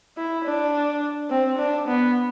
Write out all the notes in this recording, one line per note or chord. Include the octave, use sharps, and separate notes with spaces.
E4
D4
C4
D4
B3